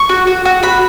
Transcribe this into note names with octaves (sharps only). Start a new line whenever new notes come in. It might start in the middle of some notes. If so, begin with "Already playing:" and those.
Already playing: C#6
F#4
F#4
F#4
F#4 B5